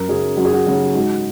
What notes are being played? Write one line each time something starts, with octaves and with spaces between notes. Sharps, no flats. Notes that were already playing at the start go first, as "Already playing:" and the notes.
Already playing: F#2 A#4
C#3 F#3 G#4
F#2 F#4
G#4
F#4
C#3 F#3 F#4
G#2 F#4